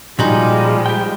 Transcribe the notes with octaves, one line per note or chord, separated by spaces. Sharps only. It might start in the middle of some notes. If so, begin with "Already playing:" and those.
A#2 F3 G3 G#3 D#4 F#4 G#4 C5
G4 G5